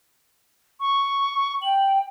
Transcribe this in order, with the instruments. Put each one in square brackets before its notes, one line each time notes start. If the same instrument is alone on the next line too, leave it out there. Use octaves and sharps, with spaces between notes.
[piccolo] C#6
[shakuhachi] G5 [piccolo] F#7